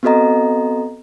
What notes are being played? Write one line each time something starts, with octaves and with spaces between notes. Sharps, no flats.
B3 C4 F#4 A4 D#5 A#5